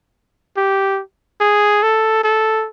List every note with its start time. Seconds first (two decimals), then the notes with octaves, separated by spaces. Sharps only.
0.57 G4
1.40 G#4
1.83 A4
2.24 A4